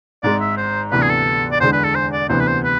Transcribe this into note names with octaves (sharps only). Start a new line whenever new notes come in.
G#1 G#2 G#3 D5
E5
C5
D2 C3 E3 B3 D4 B4
G#4
A4
D5
E2 D3 G#3 C5
B4
A4
C5
D5
D2 C3 E3 B3 C5
B4
C5
B4